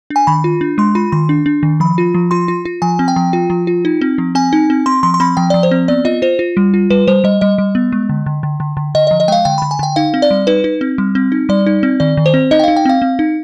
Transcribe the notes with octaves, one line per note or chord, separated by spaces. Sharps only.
D4
G#5
D#3 B5
F4
D4
G#3 C6
F4 B5
D#3 C6
D4
D4
D#3
F3 B5
F4
F3
F4 C6
F4
F4
F3 G#5
C4
G5
F3
F4
F3
F4
D#4
C4
F3
C4 G#5
D#4
C4
C4 C6
F3 C6
C6
C4 B5
F3 G5
F3 D5
C5
C4
B3 D5
F4 D#5
F4 C5
F4
G3
F4
G3 B4
G3 C5
G3 D#5
G3 D#5
G3
B3
G#3
D3
D3
D3
D3
D3
D3 D#5
F3 D#5
D#5
G#3 F5 G5
D3 G5
D3 B5
G#5
D3 G5
D#4 F5
C4
D5
G3
D#4 B4
D#4
C4
G3
C4
D#4
G3 D5
D#4
C4
D#3 D5
D#3
C5
C4
D#4 D#5
G5
D#4 F5
G5
C4 F5
C4
D#4